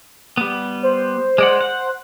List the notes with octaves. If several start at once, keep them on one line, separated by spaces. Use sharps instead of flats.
G3 B3
C5
G#3 D5 F#5
F#5